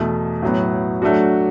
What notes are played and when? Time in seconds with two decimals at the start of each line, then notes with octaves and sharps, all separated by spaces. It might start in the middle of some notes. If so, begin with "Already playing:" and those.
Already playing: E2 B2 A3
0.42 A2 F#3 B3
1.02 F#3 A3 D4 F#4